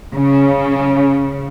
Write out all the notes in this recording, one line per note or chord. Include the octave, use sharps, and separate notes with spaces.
C#3